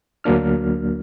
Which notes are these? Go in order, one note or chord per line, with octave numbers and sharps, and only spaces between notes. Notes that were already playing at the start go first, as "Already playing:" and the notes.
D2 F#3 A#3 D4 F6